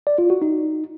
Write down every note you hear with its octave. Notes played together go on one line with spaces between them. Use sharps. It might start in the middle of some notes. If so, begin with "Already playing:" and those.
D5
F4
F#4
D#4